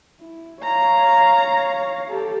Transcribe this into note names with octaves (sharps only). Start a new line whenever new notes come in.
E4
C#5 F5 A#5
G4 A4